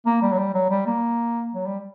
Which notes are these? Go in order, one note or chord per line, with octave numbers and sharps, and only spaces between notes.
A#3
G3
F#3
G3
F#3
G3
A#3
F#3
G3